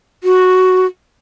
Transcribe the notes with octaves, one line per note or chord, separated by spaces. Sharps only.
F#4